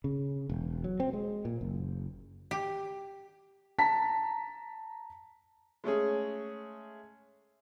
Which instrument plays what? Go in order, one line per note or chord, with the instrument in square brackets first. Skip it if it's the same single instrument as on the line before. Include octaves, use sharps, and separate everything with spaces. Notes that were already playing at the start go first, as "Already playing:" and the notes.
[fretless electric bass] C#3
E1
F#3
C4
G#3
A#2
F#1
[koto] G4
[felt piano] A5 A#5 B6
[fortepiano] G#3 A3 C#4 G#4